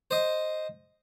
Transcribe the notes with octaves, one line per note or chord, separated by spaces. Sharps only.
C5 D#5